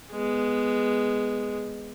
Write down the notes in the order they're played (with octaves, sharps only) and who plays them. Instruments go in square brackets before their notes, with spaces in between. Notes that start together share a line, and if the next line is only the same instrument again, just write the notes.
[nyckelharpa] G#3 B3